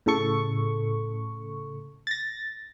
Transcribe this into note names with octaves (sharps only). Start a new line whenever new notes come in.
A2 C#3 A4 C#6
A6 A#6